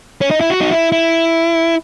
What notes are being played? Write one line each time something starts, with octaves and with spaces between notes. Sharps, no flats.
C#4
D#4
E4
F#4
D#4
E4
E4